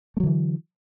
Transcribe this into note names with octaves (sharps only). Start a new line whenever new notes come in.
D3 E3 F#3 A3